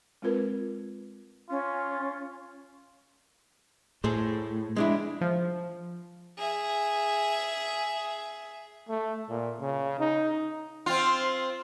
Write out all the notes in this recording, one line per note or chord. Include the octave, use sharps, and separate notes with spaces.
G#3 C4 F4 A#4 B4
C#4 F4
A2 G#4 A4 C5
G#3 D4 E4
F3
G#4 E5
A3
A#2
C#3
D#4
C4 F4